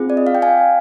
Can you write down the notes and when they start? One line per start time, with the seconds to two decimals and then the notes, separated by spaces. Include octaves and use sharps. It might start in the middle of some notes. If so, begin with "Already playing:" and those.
Already playing: C4 F4 G#4
0.10 D5
0.17 D#5
0.27 F5
0.35 G5
0.42 F5 G#5